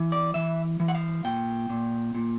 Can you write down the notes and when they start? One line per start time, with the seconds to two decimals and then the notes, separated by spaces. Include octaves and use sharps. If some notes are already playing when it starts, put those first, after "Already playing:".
Already playing: E3
0.12 D5
0.34 E3 E5
0.80 E3
0.88 F#5
0.95 F5
1.24 A#2 G5
1.70 A#2
2.15 A#2